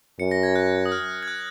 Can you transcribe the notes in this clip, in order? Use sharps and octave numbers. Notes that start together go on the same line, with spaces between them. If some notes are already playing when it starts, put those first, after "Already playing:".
F#2 C#7
A#6
G#6
F#6
D#6
F6
G#6
F#6